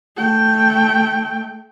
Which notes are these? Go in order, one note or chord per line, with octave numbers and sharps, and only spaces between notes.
A3 G5